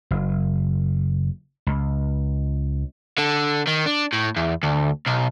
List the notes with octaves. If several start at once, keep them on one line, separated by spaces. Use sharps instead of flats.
F#1
C#2
D3
D#3
D4
A2
E2
D2
B1